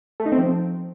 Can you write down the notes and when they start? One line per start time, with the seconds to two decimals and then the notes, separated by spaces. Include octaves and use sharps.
0.20 A3
0.26 D#4
0.32 C4
0.38 F3